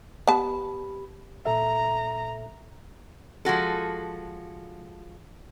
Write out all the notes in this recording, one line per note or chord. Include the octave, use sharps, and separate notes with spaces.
B3 G4 A5 B5
A#2 A4 E5 A#5
F3 G#3 F#4 A4